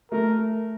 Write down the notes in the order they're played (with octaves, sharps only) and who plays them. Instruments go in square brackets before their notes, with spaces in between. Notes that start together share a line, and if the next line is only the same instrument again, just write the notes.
[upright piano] A3 [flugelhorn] A#4